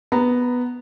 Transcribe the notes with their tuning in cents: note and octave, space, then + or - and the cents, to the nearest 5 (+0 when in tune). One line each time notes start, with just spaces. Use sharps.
B3 +0 A#5 -5